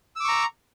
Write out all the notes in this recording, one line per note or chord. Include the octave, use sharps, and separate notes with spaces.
A#5 C#6 D6 E6